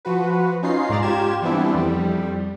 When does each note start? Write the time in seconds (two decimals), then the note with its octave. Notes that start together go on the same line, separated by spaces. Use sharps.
0.05 F3 F#4 B4
0.63 C#4 D#4 F4 C7
0.89 G#2 G#3 D5 A#5 A6
1.02 F4 G4 G#6 E7
1.42 E3 G3 B3 C4 D4 E4
1.74 F2 G3